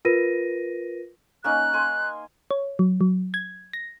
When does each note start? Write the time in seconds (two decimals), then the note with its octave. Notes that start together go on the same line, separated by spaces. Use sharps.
0.05 F4 A#4 B4 A#6 D#7
1.44 A#3 C#4 D#4 F#6
1.73 G#5 C6
2.51 C#5
2.79 F#3
3.01 F#3
3.34 G#6
3.73 A#6